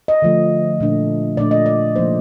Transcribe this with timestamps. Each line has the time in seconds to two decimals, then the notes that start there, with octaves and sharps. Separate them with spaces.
0.08 D#5
0.22 D3 F3 A3
0.80 A#2 A3 D4
1.37 A#2 A3 D4 D5
1.51 D#5
1.66 D5
1.96 C3 F3 A#3 D#4 C5